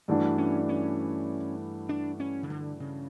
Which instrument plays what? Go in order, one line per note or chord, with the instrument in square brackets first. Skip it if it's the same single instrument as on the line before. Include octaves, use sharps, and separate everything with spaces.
[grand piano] G2 E3 A3 D4 F#4 [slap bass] G3
[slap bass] C#4
C#4
D4
C#4
C#3
D3
C#3